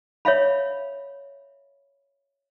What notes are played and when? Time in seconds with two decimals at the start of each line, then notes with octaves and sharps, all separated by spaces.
0.25 C#5 E5 F5 B5